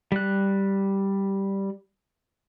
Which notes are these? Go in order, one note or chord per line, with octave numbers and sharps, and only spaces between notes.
G3 F#6